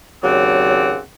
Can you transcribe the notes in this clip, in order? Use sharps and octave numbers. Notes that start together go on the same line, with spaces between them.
D#2 C#3 F#3 C4 D5 F#5